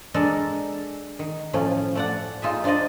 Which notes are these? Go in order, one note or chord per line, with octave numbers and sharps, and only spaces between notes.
G#3 D4 A4 A#4
D#3
A2 F3 A3 C#4 F5
A3 D5 F#5
D#4 F4 G#4 E5
D4 F4 C5 D5 D#5